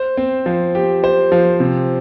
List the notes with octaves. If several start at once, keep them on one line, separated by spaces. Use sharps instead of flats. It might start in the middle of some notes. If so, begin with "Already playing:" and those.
Already playing: C5
C4
F3
G4
C5
F3
C3